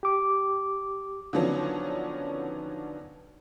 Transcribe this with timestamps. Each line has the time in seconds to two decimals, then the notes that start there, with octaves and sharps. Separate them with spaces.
0.03 G4 D6
1.33 D3 D#3 F3 F#3 B3 C#4